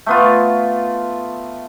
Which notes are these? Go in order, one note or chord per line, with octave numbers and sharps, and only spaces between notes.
A3 B3 F4